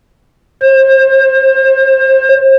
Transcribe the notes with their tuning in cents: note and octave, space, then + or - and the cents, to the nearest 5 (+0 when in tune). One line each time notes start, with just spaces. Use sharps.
C5 +35